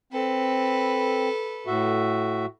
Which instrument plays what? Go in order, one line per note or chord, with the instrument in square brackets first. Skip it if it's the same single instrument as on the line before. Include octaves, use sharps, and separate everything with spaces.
[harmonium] C4 [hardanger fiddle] A4 B4
[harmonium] A2 F#4 E5